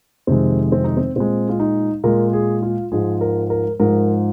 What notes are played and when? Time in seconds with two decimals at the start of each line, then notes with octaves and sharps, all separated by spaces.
0.27 F2 C3 D#3 G#3 C4
0.72 C4
0.84 D#4
0.97 C4
1.16 A#2 G#3 C4
1.49 F4
1.60 D#4
2.04 A#2 G#3 A#4
2.33 G#4
2.62 F4
2.92 G#2 F3 G#3 G#4
3.21 A#4
3.50 A#4
3.80 G#2 F3 G#3 A#4